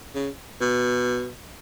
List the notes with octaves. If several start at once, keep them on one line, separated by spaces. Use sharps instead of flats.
C#3
B2